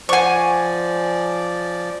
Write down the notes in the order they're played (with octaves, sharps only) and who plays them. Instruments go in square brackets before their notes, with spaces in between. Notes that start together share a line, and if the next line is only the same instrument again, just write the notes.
[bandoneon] F3 D5 [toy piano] C5 F#5 [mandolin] G#5 C#6